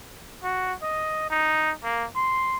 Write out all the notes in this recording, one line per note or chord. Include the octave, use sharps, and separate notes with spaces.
F#4
D#5
D#4
A#3
C6